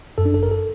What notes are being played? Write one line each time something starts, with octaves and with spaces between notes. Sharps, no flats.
F#2 A4
D4
G1 A4
A#4
A4